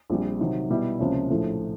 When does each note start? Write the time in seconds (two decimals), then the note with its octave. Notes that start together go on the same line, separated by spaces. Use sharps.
0.10 A#1 A#2 G3 C4
0.40 C3 D#3 F#3
0.70 B2 G3 B3 E4
0.99 C#2 C3 F3 A#3 C#4
1.30 A#1 A2 F3 A3